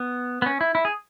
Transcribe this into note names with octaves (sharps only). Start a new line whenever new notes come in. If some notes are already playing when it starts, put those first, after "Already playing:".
Already playing: B3
B3
C#4
E4
E4
G#4